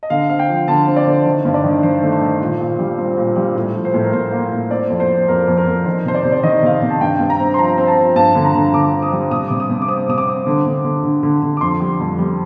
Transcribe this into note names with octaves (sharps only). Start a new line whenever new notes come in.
D#5
D3 F5
C4 F5
G5
F3
D3 A5
C4
D5
D3
D#3 C5
G2
D5
D#3
D#3 C5
A3
C5
D#3
A#2
A#2
G3
C4
A#2
G3
A2
F3
C5
A2
A#4
A2 C5
A#3
A2
C4 D5
F2
C5
C4
F2 A#4
F2
A#4
F2
D#3 C5
C3 C5
D5
C3
D5
D#3 D#5
C3 F5
D#5
C3
A5
G2 G5
G2
A#5
C4
C6
F3 A#5
C4
A5
F3
G2 A5
D3
A#5
D3
D3 D6
C4
D#6
G3
C3 D#6
C3 D6
D#6
C3
D6
C4 D#6
C3 D#6
D6
C4
D3
D3
D3
D3
D3
D3
D6
F2 C6
G3
F2
G3